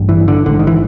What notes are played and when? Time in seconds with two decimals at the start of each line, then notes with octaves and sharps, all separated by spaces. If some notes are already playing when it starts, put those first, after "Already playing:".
Already playing: A1 G2
0.09 E3
0.28 D3
0.46 A1 G#2 D3
0.59 D#3
0.67 E3